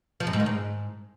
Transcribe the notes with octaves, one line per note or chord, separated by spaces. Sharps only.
F3
F#2
G#2
D#3
G#2